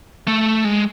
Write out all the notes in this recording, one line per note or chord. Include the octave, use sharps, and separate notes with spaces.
A3
G#3